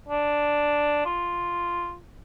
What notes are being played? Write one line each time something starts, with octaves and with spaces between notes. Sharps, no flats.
D4
F4